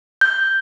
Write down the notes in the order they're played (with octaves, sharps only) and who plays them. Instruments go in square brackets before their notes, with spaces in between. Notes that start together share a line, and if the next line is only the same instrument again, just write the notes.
[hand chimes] G6